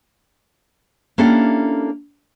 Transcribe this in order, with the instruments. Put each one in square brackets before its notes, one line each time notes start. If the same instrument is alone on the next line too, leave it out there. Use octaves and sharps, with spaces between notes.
[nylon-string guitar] A#3 C#4 D4 E4 G4 A4